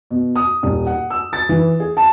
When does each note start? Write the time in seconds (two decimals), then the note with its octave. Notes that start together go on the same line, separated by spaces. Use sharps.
0.11 B2
0.36 D#6
0.63 D#1
0.87 F#5
1.10 E6
1.33 A6
1.49 E3
1.80 G#4
1.97 A5